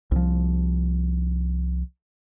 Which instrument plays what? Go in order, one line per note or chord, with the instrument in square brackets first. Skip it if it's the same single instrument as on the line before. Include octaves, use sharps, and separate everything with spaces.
[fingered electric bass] C2 F3